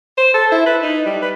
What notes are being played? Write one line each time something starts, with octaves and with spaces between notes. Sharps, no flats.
C5
A4
E4
B4
D#4
G3
B4